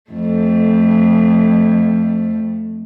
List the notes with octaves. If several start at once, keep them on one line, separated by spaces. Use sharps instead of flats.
F2 A3